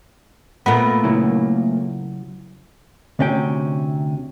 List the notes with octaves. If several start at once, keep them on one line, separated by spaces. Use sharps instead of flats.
A#2 A3 B3 B5
C#3 F#3 E4
D2 C3 C#4 G5